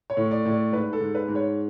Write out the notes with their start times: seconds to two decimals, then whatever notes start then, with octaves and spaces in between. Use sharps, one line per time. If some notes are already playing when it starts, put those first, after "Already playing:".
0.10 C#5
0.17 A2
0.31 D5
0.45 A2
0.52 D5
0.72 G#2 B4
0.93 A4
1.00 G#2
1.15 B4
1.28 G#2
1.35 C#5